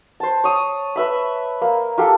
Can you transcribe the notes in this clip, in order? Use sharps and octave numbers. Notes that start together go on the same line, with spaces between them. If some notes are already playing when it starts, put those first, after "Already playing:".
C5 A5
C#5 D#6
B4 E5 B5
A#3
F4 G4 A4